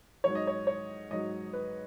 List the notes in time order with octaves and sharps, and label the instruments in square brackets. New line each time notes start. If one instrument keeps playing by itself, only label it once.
[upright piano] G#2 F#3 C#5
D#5
C#5
C#5
G#2 F#3 D#5
B4